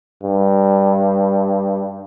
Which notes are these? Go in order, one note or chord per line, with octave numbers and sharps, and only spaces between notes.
G2